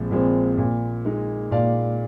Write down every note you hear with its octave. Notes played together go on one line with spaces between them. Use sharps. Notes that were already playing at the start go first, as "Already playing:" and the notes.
Already playing: A#1 F3 G#3 C4
A#2 F3 G#3 C4
A#2
G#3 D#4
A#2 D5 F5